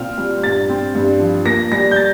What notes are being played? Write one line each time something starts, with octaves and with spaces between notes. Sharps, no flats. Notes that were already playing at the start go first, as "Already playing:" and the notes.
Already playing: A#2 C4 F6
G3
G2 A6
C4
G2
F3
A#3 A#6
G3 A#6
G6
A6